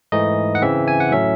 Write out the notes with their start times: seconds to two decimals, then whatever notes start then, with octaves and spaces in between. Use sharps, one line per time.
0.12 G#2 E3 A3 D#4 D#5
0.55 F#5
0.62 C#3 E3 C4 E5
0.88 G#5
1.00 F#5
1.11 A2 F#3 A3 C#4 E5